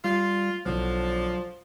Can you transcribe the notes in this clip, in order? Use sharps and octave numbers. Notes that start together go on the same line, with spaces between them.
G3 F4
B1 D3 F3 F#3 E4